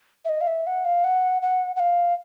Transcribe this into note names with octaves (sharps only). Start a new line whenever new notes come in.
E5
D#5
F5
E5
F#5
F5
F#5
F#5
F#5
F5